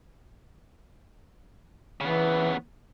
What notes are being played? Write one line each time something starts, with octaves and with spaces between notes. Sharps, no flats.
C#3 E3 B3